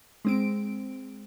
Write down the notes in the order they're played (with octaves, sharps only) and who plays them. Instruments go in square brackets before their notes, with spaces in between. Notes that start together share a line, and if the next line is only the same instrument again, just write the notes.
[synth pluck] G#3 C4 D7